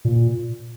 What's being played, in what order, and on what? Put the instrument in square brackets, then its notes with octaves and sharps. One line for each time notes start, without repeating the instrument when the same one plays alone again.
[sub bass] A#2